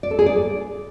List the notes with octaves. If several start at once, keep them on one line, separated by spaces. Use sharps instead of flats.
D5
A4
G#4
D5